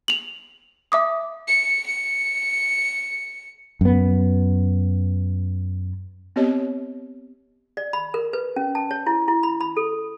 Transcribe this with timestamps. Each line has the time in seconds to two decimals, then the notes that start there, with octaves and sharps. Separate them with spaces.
0.08 F7 F#7
0.92 E5 D6 D#6
1.48 C#7
1.87 C#7
3.81 F#2 B3
6.36 B3 C4 G4 C#5 D#5
7.77 D5
7.93 B5
8.14 A#4
8.33 B4
8.56 C#4
8.75 A5
8.91 C#5
9.07 E4
9.28 E4
9.43 B5
9.61 B5
9.77 A4